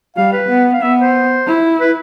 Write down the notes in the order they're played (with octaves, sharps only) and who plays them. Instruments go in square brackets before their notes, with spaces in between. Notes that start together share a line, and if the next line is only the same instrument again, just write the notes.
[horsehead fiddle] G3 [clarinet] F5
[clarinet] B4
[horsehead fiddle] B3
[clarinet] F5
[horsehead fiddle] B3 [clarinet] E5
[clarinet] C5
[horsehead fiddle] E4
[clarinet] B4